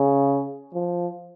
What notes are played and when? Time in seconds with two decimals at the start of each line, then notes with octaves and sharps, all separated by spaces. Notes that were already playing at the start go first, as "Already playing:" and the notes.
Already playing: C#3
0.74 F3